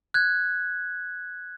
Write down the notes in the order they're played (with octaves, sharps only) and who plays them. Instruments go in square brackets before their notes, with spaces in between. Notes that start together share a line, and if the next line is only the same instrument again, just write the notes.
[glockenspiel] F#6 G#6